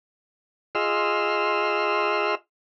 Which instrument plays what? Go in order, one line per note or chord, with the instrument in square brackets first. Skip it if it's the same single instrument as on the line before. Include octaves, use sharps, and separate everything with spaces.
[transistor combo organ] F4 G#4 D#5 C6 E6 F6